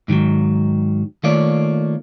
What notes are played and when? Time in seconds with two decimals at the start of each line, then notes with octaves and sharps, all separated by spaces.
0.08 G#2 D#3 F3 F#3
1.23 D#3 A3 A#3 F4 C#5 D5